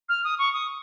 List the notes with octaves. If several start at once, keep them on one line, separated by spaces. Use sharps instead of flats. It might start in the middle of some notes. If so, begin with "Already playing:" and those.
F6
D#6
C#6
D#6